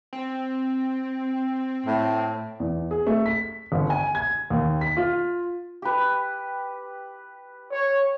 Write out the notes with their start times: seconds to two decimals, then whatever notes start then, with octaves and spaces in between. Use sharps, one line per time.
0.13 C4
1.86 A2
2.60 E2
2.91 G#4
3.07 A3
3.26 B6
3.72 G1
3.90 G#5
4.15 G#6
4.50 D#2
4.81 B6
4.97 F4
5.82 G4 B4
7.71 C#5